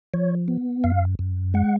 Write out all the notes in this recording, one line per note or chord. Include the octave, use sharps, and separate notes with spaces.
F3 C#5
B3
F#2 F5
F#2
G#3 F#5